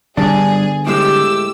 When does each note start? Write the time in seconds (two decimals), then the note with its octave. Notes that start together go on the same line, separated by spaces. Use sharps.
0.17 G2 D3 G3 B3 D4 G#4
0.87 A2 G#3 G4 E6